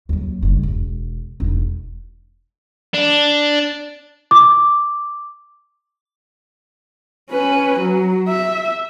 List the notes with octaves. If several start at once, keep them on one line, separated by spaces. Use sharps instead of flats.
D#2 F#3
F#1 G2
E1
E1 D#4
D4
D6
C#4 B4
F#3
E5